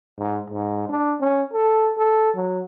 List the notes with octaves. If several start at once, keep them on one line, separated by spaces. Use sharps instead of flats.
G#2
G#2
D4
C#4
A4
A4
F#3